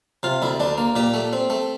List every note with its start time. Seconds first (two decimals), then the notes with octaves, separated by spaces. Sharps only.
0.23 C3 F4
0.42 D2 E4
0.60 D2 D4
0.78 A#3
0.96 A#2 G4
1.14 A3
1.33 C4
1.50 A3